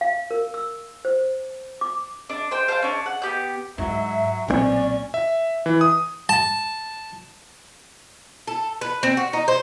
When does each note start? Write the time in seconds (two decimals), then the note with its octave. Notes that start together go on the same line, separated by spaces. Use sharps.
0.01 F5
0.31 A#4
0.54 E6
1.05 C5
1.81 D6
2.30 D4
2.51 C5 G5
2.68 C5 F5 G5 A5
2.82 C#4 D4
3.06 F#5
3.22 B3 G4 G6
3.78 G#2 F#3 E5
4.48 B1 A#2 G3 C4 C#4 D5
5.14 E5
5.66 E3
5.81 D#6
6.29 A5
8.48 A4
8.81 B4
9.03 C4
9.17 F#4
9.33 D#4
9.48 C5